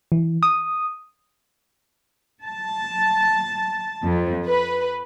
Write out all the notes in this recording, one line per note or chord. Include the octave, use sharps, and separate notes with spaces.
E3
D#6
A5
F2
B4